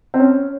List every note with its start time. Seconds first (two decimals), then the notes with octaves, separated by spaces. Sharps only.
0.14 C4
0.19 C#4